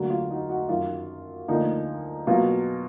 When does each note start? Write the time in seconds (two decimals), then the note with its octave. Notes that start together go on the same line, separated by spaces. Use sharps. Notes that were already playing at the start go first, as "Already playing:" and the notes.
Already playing: D2 D3 F#3 A#3 F#4 A#4
0.10 F4
0.30 D#4 F#4
0.49 D#4 F#4
0.69 F#2 D#3 F#3 F4
1.48 D2 D3 F3 A#3 D#4
2.27 B2 F#3 A#3 F4